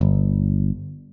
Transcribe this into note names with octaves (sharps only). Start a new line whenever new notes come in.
G1